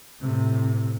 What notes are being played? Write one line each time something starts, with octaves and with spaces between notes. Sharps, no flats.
A2 C3